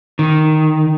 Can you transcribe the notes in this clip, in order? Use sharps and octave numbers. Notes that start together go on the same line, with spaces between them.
D#3